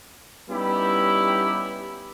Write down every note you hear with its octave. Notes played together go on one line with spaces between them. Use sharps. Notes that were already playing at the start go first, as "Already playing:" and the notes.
G3 B3 C#4 D#4 E4 G4